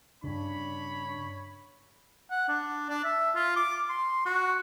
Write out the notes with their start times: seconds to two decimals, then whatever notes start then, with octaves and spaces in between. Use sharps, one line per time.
0.24 G2 C#3 D4 C#5 B5
2.31 F#5
2.48 D4
2.90 D4
3.04 E5
3.35 F4
3.56 D6
3.89 C6
4.26 F#4